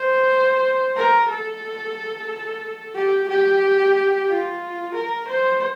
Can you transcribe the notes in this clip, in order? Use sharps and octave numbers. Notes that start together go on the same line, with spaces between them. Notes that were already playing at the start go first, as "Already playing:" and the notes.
Already playing: C5
A#4
A4
G4
G4
F4
A#4
C5